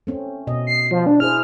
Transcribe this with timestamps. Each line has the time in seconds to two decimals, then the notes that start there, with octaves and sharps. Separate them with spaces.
0.07 A3 C4 C#4
0.47 B2 D#5
0.67 C7
0.91 F3
1.06 D4
1.20 E4 G#4 C5 F6